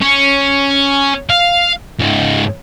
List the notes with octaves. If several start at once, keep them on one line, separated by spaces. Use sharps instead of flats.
C#4
F5
C#2 G#2